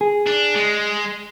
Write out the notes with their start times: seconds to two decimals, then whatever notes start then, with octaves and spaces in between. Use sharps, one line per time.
0.01 G#4
0.27 D4
0.56 G#3